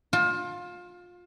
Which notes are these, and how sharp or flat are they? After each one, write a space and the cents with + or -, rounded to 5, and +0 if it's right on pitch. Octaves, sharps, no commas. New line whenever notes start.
F4 +25 A5 -15